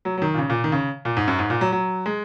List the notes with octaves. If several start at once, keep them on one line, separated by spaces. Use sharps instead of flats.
F#3
F#3
D#3
A#2
C#3
A#2
D#3
C#3
A#2
G#2
F#2
G#2
A#2
F#3
F#3
G#3